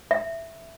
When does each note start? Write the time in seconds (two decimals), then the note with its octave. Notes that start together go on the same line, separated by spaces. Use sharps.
0.11 E5